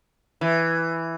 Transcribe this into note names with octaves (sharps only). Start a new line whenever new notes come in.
E3